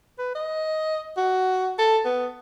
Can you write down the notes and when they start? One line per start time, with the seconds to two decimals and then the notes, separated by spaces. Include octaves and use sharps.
0.18 B4
0.35 D#5
1.17 F#4
1.79 A4
2.05 B3